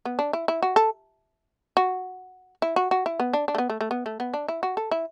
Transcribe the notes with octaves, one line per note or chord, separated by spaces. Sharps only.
B3
D4
E4
E4
F#4
A4
F#4
E4
F#4
F#4
E4
B3
D4
D4
A3
B3
A3
A3
B3
A3
B3
D4
E4
F#4
A4
E4